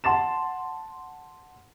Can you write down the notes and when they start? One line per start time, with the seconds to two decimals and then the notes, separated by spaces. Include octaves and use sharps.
0.04 F#5 A5 C6 A6 E7